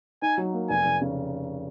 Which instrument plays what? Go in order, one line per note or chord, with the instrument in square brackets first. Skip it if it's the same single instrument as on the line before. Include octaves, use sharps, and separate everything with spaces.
[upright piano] D#4 [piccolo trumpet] G#5
[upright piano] F#3
A#3
[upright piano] F1 [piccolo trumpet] G#5
[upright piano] F1
C#3